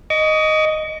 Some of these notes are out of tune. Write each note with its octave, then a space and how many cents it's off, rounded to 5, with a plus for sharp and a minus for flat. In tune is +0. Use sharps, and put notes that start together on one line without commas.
D#5 +0 C#6 +45